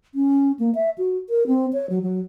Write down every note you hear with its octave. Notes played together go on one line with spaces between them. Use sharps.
C#4
A#3
E5
F#4
A#4
C4
C#5
F#3
F#3